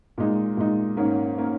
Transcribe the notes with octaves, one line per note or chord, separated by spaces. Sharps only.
A#2 G#3 D#4
A#2 G#3 D#4
G#2 D#3 A#3 C#4
D#3 A#3 C#4